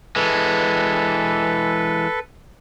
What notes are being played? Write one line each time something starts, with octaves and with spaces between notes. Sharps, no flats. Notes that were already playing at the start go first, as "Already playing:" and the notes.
E3 G#3 A4 B4